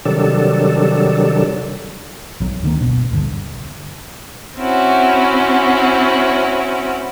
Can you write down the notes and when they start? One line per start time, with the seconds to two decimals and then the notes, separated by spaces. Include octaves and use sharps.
0.06 C3 D#3 F#3 G3 D4 A4
2.40 B1 F#3
2.63 D2 D3 D#3 A#3
2.80 F#1 B2
3.10 D1 B1 G2 D3
4.58 C4 C#4 E4 F#4